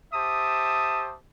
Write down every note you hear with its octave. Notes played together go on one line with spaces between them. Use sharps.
G4 C5 E5 A5 D#6